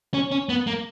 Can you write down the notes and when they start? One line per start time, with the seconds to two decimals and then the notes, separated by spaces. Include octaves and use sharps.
0.14 C#4
0.32 C#4
0.49 B3
0.67 A#3